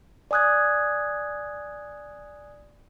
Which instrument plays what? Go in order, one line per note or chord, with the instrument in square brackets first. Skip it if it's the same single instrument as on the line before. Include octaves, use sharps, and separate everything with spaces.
[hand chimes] D5 G#5 D#6 F#6 G#6